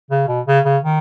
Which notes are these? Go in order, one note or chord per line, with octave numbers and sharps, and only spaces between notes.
C#3
B2
C#3
C#3
D#3